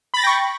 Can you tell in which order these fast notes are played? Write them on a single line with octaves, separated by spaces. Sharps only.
B5 A6 A#6 G5 C#6